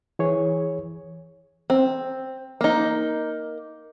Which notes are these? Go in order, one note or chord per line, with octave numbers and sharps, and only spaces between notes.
E3 G#4 C#5
C4
A#3 D#4